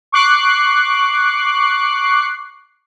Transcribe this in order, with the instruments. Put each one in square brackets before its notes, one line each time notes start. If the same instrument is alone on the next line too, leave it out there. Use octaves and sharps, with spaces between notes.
[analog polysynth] C#6 D6 F#6 C7